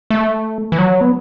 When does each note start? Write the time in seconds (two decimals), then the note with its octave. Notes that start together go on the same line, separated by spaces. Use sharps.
0.10 A3
0.72 E3
0.78 F#3
1.01 B3